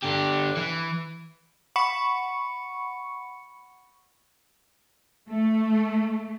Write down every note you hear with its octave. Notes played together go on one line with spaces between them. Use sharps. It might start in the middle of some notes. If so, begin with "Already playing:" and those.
D3 G4
E3
F#5 B5 C#6 C#7
A3